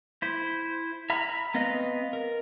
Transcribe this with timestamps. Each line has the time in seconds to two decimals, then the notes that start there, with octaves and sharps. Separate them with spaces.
0.22 E4 C5
1.10 E5 A#5 B5 F6
1.54 B3 C4 B4 D#5 F5
2.13 A#4